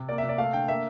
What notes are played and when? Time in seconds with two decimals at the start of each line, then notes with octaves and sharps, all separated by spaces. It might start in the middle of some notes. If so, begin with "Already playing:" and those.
Already playing: C3
0.09 A#3 D5
0.18 E5
0.23 C3
0.29 D5
0.38 A3 F5
0.53 D3 G5
0.68 A#3 E5